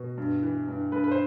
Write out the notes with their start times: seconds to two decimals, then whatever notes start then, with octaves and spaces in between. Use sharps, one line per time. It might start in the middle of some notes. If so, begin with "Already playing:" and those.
Already playing: B2
0.18 G2
0.43 E3
0.68 G2
0.92 G2 B4
1.04 B4
1.11 C5